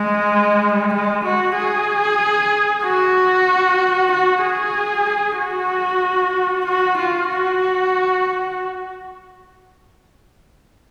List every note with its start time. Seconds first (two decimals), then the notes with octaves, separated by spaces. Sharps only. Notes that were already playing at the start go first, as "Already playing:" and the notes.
Already playing: G#3
0.93 G#3
1.24 F#4
1.56 G#4
2.84 F#4
4.11 F#4
4.43 G#4
5.38 F#4
6.65 F#4
6.97 F4
7.29 F#4